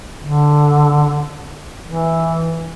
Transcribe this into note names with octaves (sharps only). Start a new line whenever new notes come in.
D3
E3